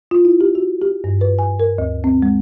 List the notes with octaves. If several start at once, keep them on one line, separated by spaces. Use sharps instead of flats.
F4
E4
G4
F#4
G4
G2
B4
G#5
A#4
D2
C4
G#3